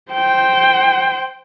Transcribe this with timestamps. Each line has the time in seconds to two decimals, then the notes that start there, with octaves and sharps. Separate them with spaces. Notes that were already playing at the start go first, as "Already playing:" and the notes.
0.12 C5 G5